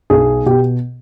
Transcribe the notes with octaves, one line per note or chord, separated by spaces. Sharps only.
B1 G#4
B2 G4